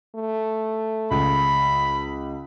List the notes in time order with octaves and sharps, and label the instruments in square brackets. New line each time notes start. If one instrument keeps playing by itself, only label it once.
[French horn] A3
[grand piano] C#2 [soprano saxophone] B5